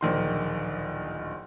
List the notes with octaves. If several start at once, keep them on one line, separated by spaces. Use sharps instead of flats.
D1 A#1 D#3 C6